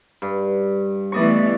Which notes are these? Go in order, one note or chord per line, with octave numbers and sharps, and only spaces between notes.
G2
E3 A3 B3 D5 D#5 C#6